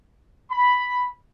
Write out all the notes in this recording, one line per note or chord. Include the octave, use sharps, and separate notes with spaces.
B5